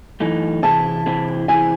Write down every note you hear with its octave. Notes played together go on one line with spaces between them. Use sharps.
F#2 E3 A3 D#4
C3 E3 C4 E4 G#4 A5
C3 E3 C4 E4 G#4
C3 E3 C4 E4 G#4 G#5